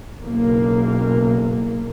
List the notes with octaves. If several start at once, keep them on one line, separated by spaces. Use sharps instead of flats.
F#1 B1 A#3